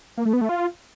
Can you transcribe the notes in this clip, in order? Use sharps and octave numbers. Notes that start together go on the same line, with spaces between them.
A#3
A3
B3
A3
F4